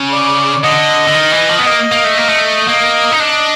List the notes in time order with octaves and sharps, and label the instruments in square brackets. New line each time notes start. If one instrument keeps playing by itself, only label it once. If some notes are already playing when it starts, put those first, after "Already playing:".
Already playing: [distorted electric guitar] C#3
[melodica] D5
[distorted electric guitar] D3 [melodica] D#5
[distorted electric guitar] D3
D#3
E3
F3
B3
[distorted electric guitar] A#3 [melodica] D#5
[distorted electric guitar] A#3
A3
A#3
A3
[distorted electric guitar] A#3 [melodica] D#5
[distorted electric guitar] D#4
[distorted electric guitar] D4 [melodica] D#5